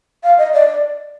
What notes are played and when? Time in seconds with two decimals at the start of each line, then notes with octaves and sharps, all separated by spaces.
0.24 F5
0.38 D#5
0.53 D5